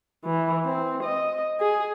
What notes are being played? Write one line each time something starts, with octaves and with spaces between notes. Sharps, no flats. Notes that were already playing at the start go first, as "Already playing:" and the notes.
E3
C4
D#5
G#4